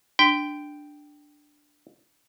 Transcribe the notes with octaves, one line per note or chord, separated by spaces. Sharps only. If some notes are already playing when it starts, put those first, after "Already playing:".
D4 G5